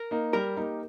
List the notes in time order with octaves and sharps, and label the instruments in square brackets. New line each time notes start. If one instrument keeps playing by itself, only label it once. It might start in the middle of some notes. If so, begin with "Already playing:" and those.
Already playing: [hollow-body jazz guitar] A#4
[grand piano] A#3 D#4
[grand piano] G3 [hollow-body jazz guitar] A#4
[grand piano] A#3 D#4 G4